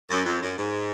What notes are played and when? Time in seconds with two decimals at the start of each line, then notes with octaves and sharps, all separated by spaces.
0.10 F#2
0.25 F2
0.42 F#2
0.58 G#2